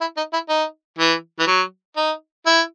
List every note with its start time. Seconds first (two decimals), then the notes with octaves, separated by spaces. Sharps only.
0.01 E4
0.17 D#4
0.33 E4
0.49 D#4
0.99 E3
1.39 E3
1.47 F#3
1.96 D#4
2.46 E4